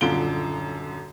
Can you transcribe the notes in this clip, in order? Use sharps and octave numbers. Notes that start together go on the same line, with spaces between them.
D#1 F#2 D3 F4 D7 G7